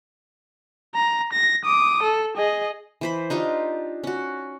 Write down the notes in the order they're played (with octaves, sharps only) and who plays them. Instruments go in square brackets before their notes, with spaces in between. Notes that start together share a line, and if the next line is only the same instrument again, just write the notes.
[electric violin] A#5
A#6
D6 D#6
A4
G#4 D#5
[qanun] E3 C5 B5
D4 D#4 F4 G4
C#4 F#4